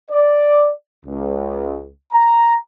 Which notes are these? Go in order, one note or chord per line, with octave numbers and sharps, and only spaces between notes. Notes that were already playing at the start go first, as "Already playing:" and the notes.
D5
C#2
A#5